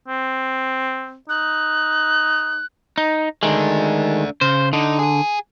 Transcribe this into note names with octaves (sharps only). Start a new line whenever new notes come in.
C4
D#4 F#6
D#4
D#3 G#3 A3 D4
C#3 C5
D3 D#4
G#4 G#5